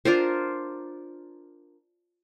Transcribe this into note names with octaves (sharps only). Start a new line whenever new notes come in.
D4 F4 A#4 C5